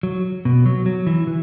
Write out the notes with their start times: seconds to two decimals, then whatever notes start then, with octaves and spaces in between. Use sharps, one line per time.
0.03 F#3
0.45 B2
0.66 F#3
0.86 F#3
1.07 E3
1.27 E3